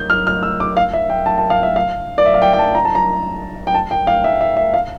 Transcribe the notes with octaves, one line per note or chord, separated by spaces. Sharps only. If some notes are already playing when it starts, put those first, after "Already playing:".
Already playing: G6
F6
F6
E6
D6
F5
E5
G5
A5
A5
F5
E5
F5
D5
E5
F5
G5
G5
A5
A#5
A5
A#5
G5
A5
G5
F5
E5
E5
E5
F5